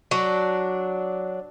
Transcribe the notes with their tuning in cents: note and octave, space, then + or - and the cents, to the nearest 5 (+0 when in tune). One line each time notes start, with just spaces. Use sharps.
F#3 +0 D4 +0